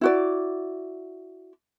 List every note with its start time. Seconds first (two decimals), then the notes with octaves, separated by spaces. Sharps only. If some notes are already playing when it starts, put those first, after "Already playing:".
0.01 E4 F#4 D5